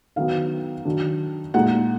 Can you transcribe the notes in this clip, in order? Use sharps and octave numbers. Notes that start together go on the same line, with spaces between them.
D#3 F#3 B3 F5
D#3 F#3 D4
A#2 G#3 D#4 F#5